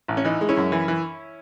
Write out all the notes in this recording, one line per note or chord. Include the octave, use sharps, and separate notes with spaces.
A1
C#4
E3 D#4
G#3
C#4 E4
F#2
E3
E3